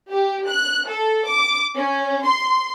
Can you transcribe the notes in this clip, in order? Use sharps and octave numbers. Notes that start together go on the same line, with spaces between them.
G4
F#6
A4
D6
C#4
C6